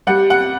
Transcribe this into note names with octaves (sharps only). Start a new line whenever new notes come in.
G3 F#5
F#5